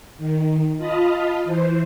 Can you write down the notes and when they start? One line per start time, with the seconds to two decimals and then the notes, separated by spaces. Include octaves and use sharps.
0.18 D#3
0.77 F4 D#5 A5 B5 D#6 F6
1.44 E3 C5